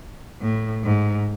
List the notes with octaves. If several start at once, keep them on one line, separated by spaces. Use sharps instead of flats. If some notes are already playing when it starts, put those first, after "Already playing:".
A2
G#2